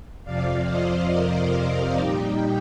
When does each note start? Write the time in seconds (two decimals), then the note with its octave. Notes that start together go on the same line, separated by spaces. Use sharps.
0.24 F2 C3 F3 D5 F5
0.67 C5 D#5
1.09 A#4 D5
1.96 A#2 G3 D#4 G4